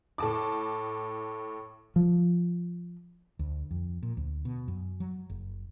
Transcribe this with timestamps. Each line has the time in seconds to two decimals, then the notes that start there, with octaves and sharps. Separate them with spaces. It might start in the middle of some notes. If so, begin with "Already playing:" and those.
0.18 A2 A5 D6
1.96 F3
3.39 D2
3.71 F2
4.03 A#2
4.17 D2
4.45 B2
4.68 F#2
5.00 F#3
5.30 F#1